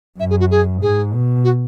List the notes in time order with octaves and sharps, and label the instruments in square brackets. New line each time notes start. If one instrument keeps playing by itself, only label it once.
[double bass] F#2 [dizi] E5
[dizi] G#4
F#4
G#4
[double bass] G#2 [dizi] G#4
[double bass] B2
[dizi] F#4